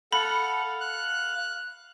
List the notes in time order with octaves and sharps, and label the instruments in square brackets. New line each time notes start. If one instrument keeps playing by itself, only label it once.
[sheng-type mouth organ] A4 F#5 [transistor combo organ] F5 [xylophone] B5
[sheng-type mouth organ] F#6